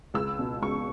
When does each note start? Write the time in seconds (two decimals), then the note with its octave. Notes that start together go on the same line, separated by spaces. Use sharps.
0.14 C#2 E6
0.39 B2
0.62 C#2 C#6